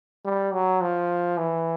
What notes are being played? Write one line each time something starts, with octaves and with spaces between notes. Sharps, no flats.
G3
F#3
F3
E3